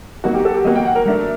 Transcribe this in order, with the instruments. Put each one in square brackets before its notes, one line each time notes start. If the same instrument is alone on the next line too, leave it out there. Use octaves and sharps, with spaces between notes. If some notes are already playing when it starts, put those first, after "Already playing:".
[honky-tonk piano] F#3 A#3 F#4 [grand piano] D#4
[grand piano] G4
A4
G4
[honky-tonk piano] F#3 A#3 F#4 [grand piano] D#5
[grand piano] G5
F#5
A#4
[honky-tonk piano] F#3 A3 D4